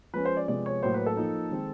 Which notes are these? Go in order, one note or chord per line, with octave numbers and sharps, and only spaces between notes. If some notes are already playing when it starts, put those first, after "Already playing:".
F3 G#3 C#4 B4
C5
D5
C3 F3 G#3 B3 D5
C#5
A2 F#3 A#3 C5
B4
A4
F3 A#3 D#4
D#3 G#3 C4